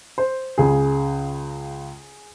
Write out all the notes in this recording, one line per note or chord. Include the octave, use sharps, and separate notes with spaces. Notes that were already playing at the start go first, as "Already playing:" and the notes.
C5
C#2 C#3 G#4